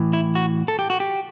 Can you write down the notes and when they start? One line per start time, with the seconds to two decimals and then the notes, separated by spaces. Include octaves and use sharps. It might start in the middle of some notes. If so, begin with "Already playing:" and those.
Already playing: A2 E3
0.13 E4
0.35 F#4
0.68 A4
0.79 G4
0.90 F#4
1.00 G4